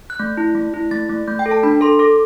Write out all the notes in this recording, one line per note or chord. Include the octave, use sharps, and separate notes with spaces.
F#6
A3 G6
E4
A3
E4
A3 A6
A3
A3 G6
G5
A4
A5
D4 B5
A4 C6
A4 D6